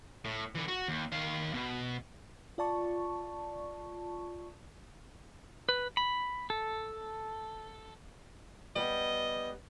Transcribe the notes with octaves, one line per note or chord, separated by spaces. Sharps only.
A2
D3 E3
F#4
D#2
D#3 F5
B2
F4 D5 A5 C#6
B4
B5
A4
G3 B3 D#5